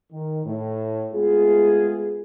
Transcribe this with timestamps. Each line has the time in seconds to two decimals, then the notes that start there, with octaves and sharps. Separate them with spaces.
0.13 D#3
0.45 A2
1.14 G#3 A3 B3 F4 G#4